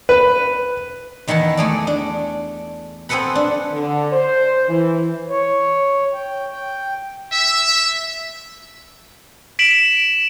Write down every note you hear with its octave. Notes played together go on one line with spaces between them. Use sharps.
B4
E2 D#3 E4 F#5 A5
A3 G#4 D5
D4
C4 G#4 A4 B4 F#5 B5
D4
D3
C5
E3
C#5
G5
G5
E5
B6 D7 E7 F#7